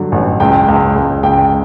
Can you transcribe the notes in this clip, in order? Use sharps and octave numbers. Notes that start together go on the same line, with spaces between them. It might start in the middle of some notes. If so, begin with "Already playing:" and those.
Already playing: G2 D3 F#3
A1
C#2 G5
C#2
C#2
C#2 G5